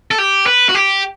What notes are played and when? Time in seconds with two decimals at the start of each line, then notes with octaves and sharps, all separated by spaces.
0.11 A4
0.18 G4
0.46 B4
0.69 F#4
0.75 G4